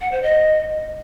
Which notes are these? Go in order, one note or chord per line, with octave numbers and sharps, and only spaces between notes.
F#5
C5
D#5